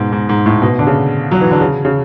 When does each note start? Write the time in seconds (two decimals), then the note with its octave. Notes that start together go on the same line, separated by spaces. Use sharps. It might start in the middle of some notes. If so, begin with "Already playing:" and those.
Already playing: G#2 B2
0.12 G#2
0.29 G#2
0.46 A2
0.62 B2
0.79 D3
0.87 C#3
1.31 F#3
1.41 E3
1.51 D3
1.61 C#3
1.85 C#3